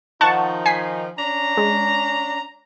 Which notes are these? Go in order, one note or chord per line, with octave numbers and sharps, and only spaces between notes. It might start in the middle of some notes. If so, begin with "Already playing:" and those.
D#3 F3 D#4 F#5 A5 C#6
G#5 B6 C7
C#4 D4 A#5
G#3